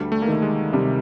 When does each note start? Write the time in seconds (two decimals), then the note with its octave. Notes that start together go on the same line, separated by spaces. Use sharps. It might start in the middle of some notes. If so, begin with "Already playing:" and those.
Already playing: D2 G3
0.12 A3
0.22 A#3
0.27 D#3
0.32 A3
0.42 G#3
0.73 C3 G3